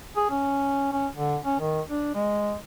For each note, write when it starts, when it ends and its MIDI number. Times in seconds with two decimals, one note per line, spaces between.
0.16 0.26 68
0.30 0.91 61
0.92 1.08 61
1.15 1.36 50
1.45 1.58 61
1.60 1.81 51
1.90 2.14 62
2.15 2.56 56